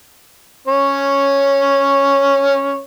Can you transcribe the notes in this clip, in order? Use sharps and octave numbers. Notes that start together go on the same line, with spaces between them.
C#4 C#5